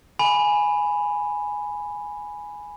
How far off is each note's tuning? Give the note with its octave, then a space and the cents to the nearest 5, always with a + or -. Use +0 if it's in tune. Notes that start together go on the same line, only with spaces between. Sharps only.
G#5 +0 B5 +0